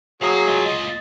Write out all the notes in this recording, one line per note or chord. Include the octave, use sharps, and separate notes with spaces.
F#3 G#4 F5 A#5
G#3 F4
D#5